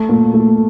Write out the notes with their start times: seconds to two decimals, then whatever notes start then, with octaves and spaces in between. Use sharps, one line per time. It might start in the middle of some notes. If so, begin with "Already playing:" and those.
Already playing: A3
0.09 A#2
0.34 A3